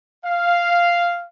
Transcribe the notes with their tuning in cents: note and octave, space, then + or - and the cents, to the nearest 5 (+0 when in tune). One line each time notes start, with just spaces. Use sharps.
F5 -5